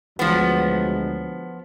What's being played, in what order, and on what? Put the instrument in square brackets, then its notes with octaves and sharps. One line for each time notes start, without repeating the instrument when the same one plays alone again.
[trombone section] D2 F#3 G#3 [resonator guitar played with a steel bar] F3 B3